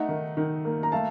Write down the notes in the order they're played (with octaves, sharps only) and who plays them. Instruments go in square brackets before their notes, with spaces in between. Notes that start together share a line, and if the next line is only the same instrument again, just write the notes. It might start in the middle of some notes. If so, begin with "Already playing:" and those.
Already playing: [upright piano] A3 D#4 F#5
D#3
D#3
A#3
A#5
A3 F5 A5